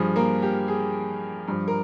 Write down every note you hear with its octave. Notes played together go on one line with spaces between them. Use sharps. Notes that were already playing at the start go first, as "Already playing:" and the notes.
Already playing: G2 F3 G#4
A#3 A#4
G4
G#4
G2 F3
A#4